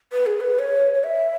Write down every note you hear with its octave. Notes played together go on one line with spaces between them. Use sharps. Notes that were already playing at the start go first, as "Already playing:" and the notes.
B4
G#4
B4
C#5
C#5
E5